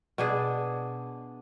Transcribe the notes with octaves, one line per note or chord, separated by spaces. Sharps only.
B2 D4 G#4